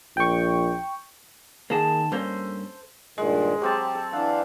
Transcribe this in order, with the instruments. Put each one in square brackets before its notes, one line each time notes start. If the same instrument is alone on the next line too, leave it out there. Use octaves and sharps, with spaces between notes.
[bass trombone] A#1 [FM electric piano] G5 C#6
[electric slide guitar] D#3 A5 [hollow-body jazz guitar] A#3 G#4
[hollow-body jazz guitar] G2 A#3 C#4 [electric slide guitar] A4 C5
[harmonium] G2 A#2 D#3 [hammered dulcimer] G#3
[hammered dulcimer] F#3 C4 A5 [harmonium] G4
[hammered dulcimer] A4
[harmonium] E3 D4 F5 [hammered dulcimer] F#5